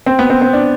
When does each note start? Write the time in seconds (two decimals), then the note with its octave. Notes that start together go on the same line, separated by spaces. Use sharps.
0.06 C4
0.19 B3
0.30 C4
0.42 C4
0.53 D4